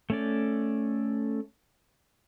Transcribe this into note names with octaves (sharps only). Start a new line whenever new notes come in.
A3 C#4 D5